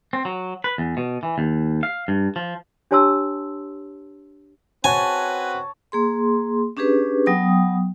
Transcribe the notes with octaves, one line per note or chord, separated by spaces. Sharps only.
C4
F#3
B4
E2
B2
E3
D#2
F5
G2
F3
D4 G4 C#5 A5 C6 E6
C4 F#4 B4 C#5 G#5 A5
A#3 G#4 C6
C#4 D4 G4 G#4 B4
F#3 B3 G5 D#6